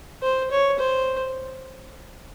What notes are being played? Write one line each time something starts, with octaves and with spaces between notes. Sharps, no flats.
C5
C#5
C5